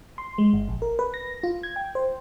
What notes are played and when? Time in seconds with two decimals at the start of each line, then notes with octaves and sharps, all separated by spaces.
0.18 C6
0.38 G#3
0.53 G1
0.69 A#1
0.82 A#4
0.99 B4
1.14 A#6
1.43 F4
1.63 G#6
1.76 G5
1.95 C5